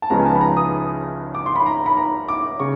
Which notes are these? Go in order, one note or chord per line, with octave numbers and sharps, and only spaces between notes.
A5
C#2 C#3 F3 G#3 B3 A#5
G#5
A5
B5
A#5
D#6
D6
C6
B5
A#5
B5
A#5
D6
C#3 C#6